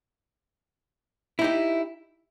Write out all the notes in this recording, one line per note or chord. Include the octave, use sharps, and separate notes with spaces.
D#4 E4 G4